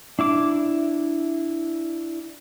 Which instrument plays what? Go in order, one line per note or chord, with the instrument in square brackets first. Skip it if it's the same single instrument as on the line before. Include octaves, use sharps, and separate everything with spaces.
[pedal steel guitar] D4 E4 D6